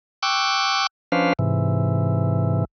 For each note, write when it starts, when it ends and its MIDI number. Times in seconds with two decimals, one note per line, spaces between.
0.23 0.87 79
0.23 0.87 85
0.23 0.87 86
0.23 0.87 88
0.23 0.87 90
1.12 1.33 53
1.12 1.33 61
1.12 1.33 62
1.12 1.33 71
1.12 1.33 72
1.12 1.33 77
1.39 2.65 44
1.39 2.65 48
1.39 2.65 52